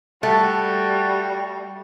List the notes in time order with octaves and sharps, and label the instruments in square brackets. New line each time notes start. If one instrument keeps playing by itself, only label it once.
[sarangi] G3 [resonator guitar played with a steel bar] A3 [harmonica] F#4